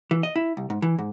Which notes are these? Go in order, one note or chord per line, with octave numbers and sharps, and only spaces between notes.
E3
D#5
E4
C2
G#2
E3
G#2